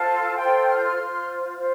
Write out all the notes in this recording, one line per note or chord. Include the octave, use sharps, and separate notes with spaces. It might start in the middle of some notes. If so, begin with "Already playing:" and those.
Already playing: F4 A4 C5 F5 A5
F4 A4 C5 G5 C6
F6
G6
C6 F6
F4 C5
F4 C5